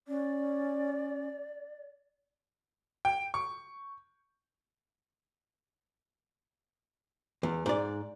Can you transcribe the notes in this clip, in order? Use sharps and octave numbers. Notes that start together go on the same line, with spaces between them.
C#4 D5
G5
C#6
E2
G#2 D5